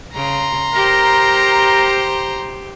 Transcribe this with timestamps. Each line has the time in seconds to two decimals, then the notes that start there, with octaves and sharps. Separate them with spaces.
0.15 C#3 A#5 C6
0.74 G4 A#4 C5